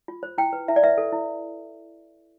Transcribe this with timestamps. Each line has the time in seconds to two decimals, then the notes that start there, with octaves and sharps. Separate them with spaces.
0.08 F4
0.23 C5
0.38 E4 G5
0.53 B4
0.68 E4 E5
0.76 D5
0.83 B4 E5
0.98 A4
1.12 E4